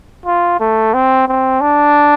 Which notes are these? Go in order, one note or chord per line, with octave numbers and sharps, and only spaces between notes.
F4
A3
C4
C4
D4